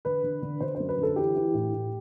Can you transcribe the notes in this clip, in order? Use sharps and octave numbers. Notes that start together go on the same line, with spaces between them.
D3 B4
D3
D3
D3 C5
F#2 C5
B4
D3
A4
E3 G4
E3
A2
A2